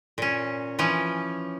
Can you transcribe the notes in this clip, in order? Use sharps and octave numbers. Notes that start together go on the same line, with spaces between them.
A#2 C#4
E3 F3 C#4